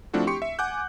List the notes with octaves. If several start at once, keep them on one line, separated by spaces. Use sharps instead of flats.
F3 A3 C4 D4 E4 F#4
G4 C6 C#6 C#7
E5
F#5 G#5 D6 F#6 G6